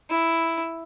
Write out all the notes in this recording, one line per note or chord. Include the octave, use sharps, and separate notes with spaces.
E4